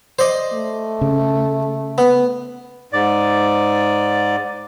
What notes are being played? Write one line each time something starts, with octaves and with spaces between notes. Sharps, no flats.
C5 D5 D#5
A3
C#3
B3
G#2 D5